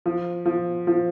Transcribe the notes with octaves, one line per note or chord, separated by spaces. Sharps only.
F3
F3
F3